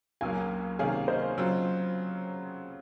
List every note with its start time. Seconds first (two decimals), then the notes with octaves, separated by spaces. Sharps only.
0.21 C#2 C#3 F#3 A#3 C#4 F5 G#5
0.79 C3 D#3 A#3 C#4 G#4 C#5 F5
1.08 C5 D#5
1.38 C#3 F#3 C4 F4